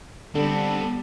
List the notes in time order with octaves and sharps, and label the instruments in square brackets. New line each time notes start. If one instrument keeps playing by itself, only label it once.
[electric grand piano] D3 [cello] G3 [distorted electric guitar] B3 C4 [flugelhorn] A4